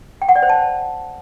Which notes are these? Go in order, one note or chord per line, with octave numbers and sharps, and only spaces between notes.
G5
F#5
D5
C5
A5